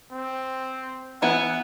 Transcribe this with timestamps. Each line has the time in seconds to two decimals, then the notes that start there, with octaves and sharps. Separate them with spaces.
0.13 C4
1.22 E3 B3 E4 F#5